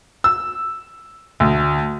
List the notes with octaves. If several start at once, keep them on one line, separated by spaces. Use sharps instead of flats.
E6
D2